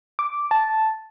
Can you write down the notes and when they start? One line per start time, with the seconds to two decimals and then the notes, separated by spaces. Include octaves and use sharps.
0.19 D6
0.51 A5